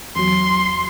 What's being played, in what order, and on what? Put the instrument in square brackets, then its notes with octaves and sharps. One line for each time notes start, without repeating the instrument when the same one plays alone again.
[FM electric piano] E2 F#3 [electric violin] C6